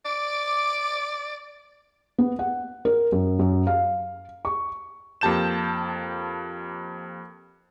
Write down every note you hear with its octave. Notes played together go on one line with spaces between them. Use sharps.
D5 D6
B3
F#5
A#4
F#2
F#2
F5
C#6
F2 A#3 G4 A5 G6 E7